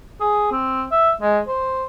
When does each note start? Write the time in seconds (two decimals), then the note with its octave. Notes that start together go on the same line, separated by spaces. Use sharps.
0.21 G#4
0.52 C4
0.91 E5
1.21 G#3
1.48 C5